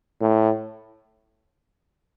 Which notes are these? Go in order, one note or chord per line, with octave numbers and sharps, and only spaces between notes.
A2